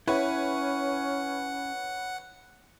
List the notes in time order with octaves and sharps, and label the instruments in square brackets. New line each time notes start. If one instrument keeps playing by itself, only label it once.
[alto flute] C#4 [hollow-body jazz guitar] E4 [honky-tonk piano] B4 C#5 [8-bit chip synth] F#5